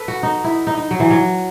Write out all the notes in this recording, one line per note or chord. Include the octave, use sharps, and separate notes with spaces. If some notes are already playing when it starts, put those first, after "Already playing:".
Already playing: A4 B4
F#4
D#4
E4
D#4
D#4
F#3
E3
F#3